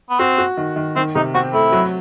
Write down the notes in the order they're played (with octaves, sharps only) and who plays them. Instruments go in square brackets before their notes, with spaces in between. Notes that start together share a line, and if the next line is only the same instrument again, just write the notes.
[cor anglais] B3
[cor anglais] C4 [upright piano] F#4
[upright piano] F#4
D#3
D#3
[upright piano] D#3 [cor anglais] C4
[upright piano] C3 [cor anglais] D#4
[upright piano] C4 [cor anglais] F#4
[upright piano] A3 [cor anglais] E4
[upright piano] F#3